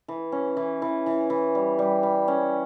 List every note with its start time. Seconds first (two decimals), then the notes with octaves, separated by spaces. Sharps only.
0.08 E3
0.32 C#4
0.57 E3
0.82 E3
1.06 E3
1.30 E3
1.55 G3
1.79 G3
2.03 G3
2.28 C#4